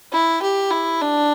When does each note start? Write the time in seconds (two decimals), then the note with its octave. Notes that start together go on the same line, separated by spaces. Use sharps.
0.12 E4
0.42 G4
0.71 E4
1.01 D4